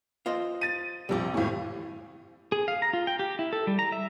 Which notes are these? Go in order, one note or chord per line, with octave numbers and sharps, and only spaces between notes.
F4 C5 D#5
A6 D#7
A#1 C3 G3 D5
G#1 A2
G#4
F5
A#5
F4
G5
G4
E4
A4
G3
A#5
E5